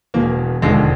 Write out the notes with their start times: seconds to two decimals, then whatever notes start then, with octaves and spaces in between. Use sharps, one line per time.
0.14 E1 E2 B2 A#3
0.62 E1 D#2 D3 F3 G#3